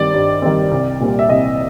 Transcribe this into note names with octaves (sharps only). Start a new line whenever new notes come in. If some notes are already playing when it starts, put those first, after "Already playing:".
Already playing: G2 D#3 G3 C4 D5
G2
D#3 G3 C4
C2
A#2 G3 C4
E5
C2 D#5